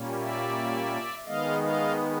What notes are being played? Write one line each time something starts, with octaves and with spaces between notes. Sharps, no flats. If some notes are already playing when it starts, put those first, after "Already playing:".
Already playing: A#2 G3 A#3 C#4
D5 E5
D#3 G#3 B3 D#5 F5
D#5 F5